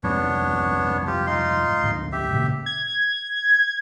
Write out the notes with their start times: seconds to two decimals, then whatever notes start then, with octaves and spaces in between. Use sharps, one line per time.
0.04 F2 G#2 C3 B3 D4 C#5
1.07 F4 G4
1.27 D#4 F4 C6
1.83 D2 G#2
2.12 G4 E5
2.31 A#2 C#3 A#3
2.66 G#6